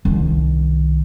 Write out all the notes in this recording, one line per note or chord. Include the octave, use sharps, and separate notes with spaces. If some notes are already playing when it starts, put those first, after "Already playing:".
C2 D#3